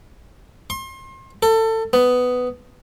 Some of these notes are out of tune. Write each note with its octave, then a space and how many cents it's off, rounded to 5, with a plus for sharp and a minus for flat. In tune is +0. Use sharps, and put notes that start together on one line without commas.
C6 +35
A4 +25
B3 +10